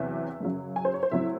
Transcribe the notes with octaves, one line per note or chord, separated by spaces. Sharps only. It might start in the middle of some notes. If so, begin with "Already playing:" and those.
Already playing: E2 C3 F#3 E5
F#2 C#3 F#3
G#5
C5
C#5
C5
A2 F#3 C4 E4 E5